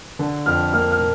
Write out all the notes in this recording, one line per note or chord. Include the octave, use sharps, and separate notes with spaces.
D3
F2 F6
A#3 F6
F6
A#2